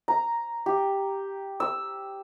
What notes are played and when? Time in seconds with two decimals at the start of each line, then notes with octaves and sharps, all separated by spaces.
0.08 A#5
0.66 G4
1.60 E6